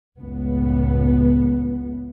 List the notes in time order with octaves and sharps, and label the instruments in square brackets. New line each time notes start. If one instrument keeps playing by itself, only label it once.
[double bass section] F#1 C#2 A2 B3